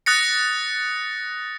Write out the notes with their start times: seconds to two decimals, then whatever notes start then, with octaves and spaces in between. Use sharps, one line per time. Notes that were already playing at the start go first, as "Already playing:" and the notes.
0.06 D#6 F#6 A6 A#6 C#7